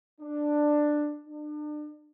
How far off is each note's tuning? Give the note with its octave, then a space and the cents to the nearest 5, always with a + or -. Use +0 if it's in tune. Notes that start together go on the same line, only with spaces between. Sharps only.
D4 +10
D4 +35